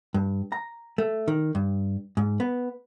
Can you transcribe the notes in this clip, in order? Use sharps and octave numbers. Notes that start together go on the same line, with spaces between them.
G2
A#5
A3
D#3
G2
G#2
B3